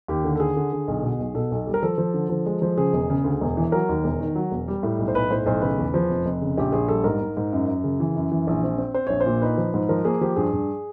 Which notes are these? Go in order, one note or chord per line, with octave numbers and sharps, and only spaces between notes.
D#2 G4
D3
A4
D3 G#4
D3
D3
B1
B2
B1
B2 A4
B1
G3
A#4
F3 A4
F3
D3
F3
G#3
F3
C#3 G#4
E1
C#3
D2
E1
E3
F#3 A#4
D#2
E1
D#3
F#3
E1
G3
A2
B1
C5
B1 B4
A2 C5
B1 C5
C#3 B4
E2
F3
F1
F1
C#3
A#1 G4
A#1 G#4
G3 A4
G#2 A#4
G#2
G#2
F#2
F#2
C#3
E3
F#2
E3
A#1
C4
C4
C4 C5
A#1 C#5
C5
A#2
D#4 B4
F3
G#2
F3 A#4
A#3 G#4
F3 G4
G2 G#4
G2